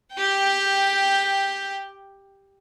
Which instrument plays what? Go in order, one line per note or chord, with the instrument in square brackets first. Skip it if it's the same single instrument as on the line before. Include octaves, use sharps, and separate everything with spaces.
[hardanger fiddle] G4 G5